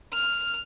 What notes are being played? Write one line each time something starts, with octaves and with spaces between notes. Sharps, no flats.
F6